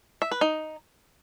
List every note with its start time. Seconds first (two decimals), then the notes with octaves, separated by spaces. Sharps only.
0.22 E5
0.32 B4
0.41 D#4